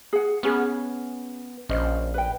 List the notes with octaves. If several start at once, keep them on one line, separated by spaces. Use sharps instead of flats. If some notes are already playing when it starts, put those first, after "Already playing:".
G#4 F#5
B3 C#4 G#4
A#1 C#4 C5 D#5
B4 G5